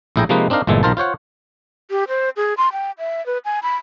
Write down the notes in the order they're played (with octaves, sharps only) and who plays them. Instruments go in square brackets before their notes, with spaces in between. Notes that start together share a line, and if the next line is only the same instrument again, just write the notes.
[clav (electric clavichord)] A#1 A2 E4 G#4 G5 A#5
C3 F3 G#3 A#3 D#4 B4
C4 D4 D#4 A#4 F5
G1 A#2 E3 G#3 A4
B1 D#3 F4 A#4 C5 A5
F4 C5 C#5 F#5
[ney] G4
C5
G#4
C6
G5
E5
B4
G#5
B5